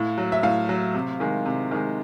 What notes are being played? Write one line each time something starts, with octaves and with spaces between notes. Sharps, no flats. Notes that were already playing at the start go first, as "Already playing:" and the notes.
Already playing: A2 F5
F#3
E5
A2 F5
F#3
C3
D#3 G#3
C3
D#3 G#3